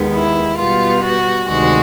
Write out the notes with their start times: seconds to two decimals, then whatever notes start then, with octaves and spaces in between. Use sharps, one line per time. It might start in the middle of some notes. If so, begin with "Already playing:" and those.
Already playing: D#2 D#3 G#3 B3
0.13 E4
0.57 B2 G3 B3 F4
1.02 F#4
1.47 D2 C3 D#3 G#3 F#4